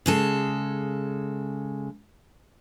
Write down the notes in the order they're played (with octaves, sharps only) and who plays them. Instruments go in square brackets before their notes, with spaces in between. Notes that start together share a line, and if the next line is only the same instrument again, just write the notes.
[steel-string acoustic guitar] C#3 G#3 A4